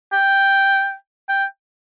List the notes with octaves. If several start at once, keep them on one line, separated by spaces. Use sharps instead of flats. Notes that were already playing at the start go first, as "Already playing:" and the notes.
G5
G5